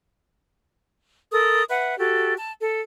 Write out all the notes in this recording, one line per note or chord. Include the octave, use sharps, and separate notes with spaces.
A4 A#4 D#6
B4 E5 F#5
F#4 G4 A4
A5
A4